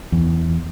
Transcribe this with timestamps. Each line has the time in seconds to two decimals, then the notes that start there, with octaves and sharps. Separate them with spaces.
0.12 E2